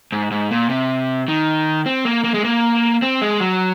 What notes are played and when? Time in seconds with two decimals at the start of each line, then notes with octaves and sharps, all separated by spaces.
0.12 G#2
0.31 G#2
0.51 A#2
0.70 C3
1.28 D#3
1.86 C4
2.05 A#3
2.24 A#3
2.34 G#3
2.44 A#3
3.02 C4
3.22 G#3
3.40 F#3